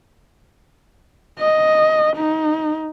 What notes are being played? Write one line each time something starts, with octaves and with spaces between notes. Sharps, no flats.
D#5
D#4